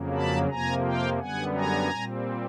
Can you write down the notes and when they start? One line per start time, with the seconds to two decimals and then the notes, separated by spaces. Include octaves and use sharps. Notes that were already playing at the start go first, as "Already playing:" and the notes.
Already playing: F2 C#3 F#3 A#3
0.14 A5 B5
0.49 F2 C3 F3 A#3 G#5 A#5
0.85 F5 G5
1.19 F#2 D3 G3 B3 F#5 G#5
1.55 G#5 A#5
1.90 A#2 G3 C4